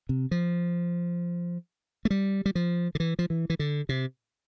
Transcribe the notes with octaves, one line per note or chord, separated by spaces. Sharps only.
C3
F3
A3
G3
G3
F3
D3
E3
F3
E3
E3
D3
C3